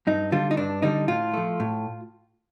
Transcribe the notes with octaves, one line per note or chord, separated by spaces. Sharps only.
G2 D#4
D3 G3 F4
D#4
G2 D4
D3 G3 D#4
A2 F4
F3 A3
A2